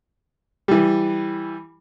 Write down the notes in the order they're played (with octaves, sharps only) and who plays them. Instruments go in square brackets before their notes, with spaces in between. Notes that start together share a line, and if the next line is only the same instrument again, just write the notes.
[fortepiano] E3 G3